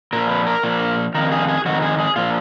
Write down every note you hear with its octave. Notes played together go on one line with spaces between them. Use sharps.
A#2 F3 A#4
B4
A#4
A#2 F3
F2 D#3 A#4
G#4
G#4
F2 D#3 F#4
G#4
G#4
A#2 F3 F4